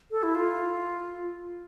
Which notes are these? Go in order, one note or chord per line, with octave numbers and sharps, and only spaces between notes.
A4
E4
F4